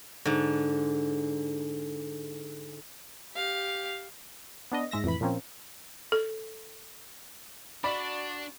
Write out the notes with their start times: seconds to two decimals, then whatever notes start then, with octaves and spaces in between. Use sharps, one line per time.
0.25 G#2 D3
3.35 G4 F5
4.72 B3 D4 D#5
4.91 G#2 G#3 E5 A#6
5.04 F2 A2 E3 B5
5.21 A#2 F3 A#3 C4 C#4
6.12 A4
7.84 D4 F#4 D5 B5